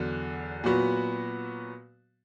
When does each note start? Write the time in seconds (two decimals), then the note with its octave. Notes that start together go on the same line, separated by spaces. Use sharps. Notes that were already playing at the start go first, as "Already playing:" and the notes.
Already playing: E2 D3 F#3
0.64 A#2 F#3 B3 F#4